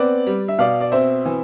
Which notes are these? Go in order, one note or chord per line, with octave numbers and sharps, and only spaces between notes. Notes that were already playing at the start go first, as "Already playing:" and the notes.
Already playing: B3 C4 B4 D5
G3
E5
B2 D5 F5
D5
C4 C5 E5
E3